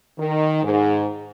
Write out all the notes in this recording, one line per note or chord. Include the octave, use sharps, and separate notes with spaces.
D#3
G#2